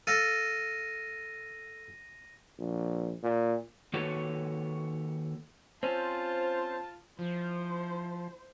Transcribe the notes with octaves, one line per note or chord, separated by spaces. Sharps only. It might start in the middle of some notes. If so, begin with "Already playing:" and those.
A4 F5 A#6 D#7
A#1
A#2
D#3 A#3 F#4 A4 B4 C#5
C4 C#4 F4 C5 A5
F3 E4 C5